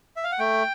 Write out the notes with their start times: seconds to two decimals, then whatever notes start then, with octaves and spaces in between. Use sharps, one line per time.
0.16 E5
0.24 F5
0.32 F#5
0.39 A3 G5